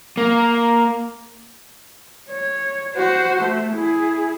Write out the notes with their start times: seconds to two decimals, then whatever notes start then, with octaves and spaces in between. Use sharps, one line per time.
0.17 A#3
2.29 C#5
2.94 F#4 C5
3.42 A3
3.73 E4 G#4